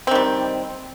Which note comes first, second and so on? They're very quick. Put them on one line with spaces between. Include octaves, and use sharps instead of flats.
C4 D#3 G3